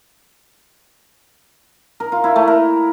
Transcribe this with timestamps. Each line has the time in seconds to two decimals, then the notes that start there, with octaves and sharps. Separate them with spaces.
2.00 A#4
2.12 F4
2.24 E4
2.36 A3
2.48 A#4